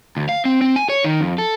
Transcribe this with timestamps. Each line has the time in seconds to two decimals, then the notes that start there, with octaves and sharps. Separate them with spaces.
0.17 D2
0.29 F5
0.45 C4
0.61 C4
0.76 G#5
0.89 C#5
1.04 D#3
1.21 F2
1.38 A4